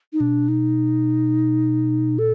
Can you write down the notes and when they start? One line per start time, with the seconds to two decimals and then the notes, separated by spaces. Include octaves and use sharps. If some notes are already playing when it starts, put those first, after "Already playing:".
0.13 D#4
0.20 B2 D4
0.48 D#4
2.18 A#2 A4